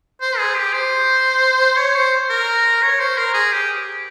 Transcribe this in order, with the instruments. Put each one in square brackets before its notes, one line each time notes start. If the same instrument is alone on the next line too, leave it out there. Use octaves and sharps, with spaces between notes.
[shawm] C5
G#4
G4
C5
C#5
C5
A#4
C#5
C5
A#4
G#4
G4